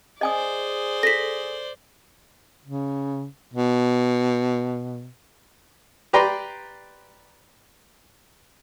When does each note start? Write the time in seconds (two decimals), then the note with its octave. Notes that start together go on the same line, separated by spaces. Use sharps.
0.21 G#4 C5 D5 D#5 G#5 D#6
1.03 A4 A#6 B6
2.65 C#3
3.54 B2
6.13 G4 B4 D5 G5 A#5 C6